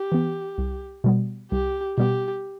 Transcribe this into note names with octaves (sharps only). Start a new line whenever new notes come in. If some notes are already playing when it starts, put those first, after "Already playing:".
Already playing: G4
E3 B3
C2
B2 G3 B3
C2 G4
B2 G3 B3 G4